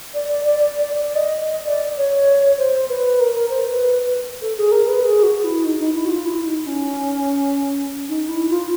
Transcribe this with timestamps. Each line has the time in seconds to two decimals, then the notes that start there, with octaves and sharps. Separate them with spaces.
0.14 D5
0.28 D5
0.45 D5
0.59 D5
0.75 D5
0.95 D5
1.15 D#5
1.51 D#5
1.67 D5
1.98 C#5
2.58 C5
2.89 B4
3.20 A#4
3.34 A#4
3.50 C5
3.65 B4
4.42 A4
4.57 G#4
4.72 A#4
4.87 B4
5.03 G#4
5.23 F#4
5.44 E4
5.64 D#4
5.80 D#4
5.94 E4
6.05 F#4
6.10 F4
6.25 E4
6.46 D#4
6.67 C#4
8.09 D#4
8.28 E4
8.50 F4